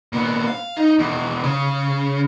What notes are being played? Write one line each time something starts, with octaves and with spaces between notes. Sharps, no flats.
A#2 B3
F5
D#4
E2 B2
C#3